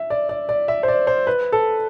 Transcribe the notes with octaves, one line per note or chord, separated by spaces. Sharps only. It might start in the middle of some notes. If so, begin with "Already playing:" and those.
Already playing: E5
D5
D5
D5
E5
C5
D5
C5
B4
A4